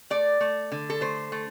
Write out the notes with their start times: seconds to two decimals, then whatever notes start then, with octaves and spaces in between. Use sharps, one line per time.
0.10 A3 D5
0.40 A3
0.72 D3
0.90 A4
1.01 A3 C5
1.32 A3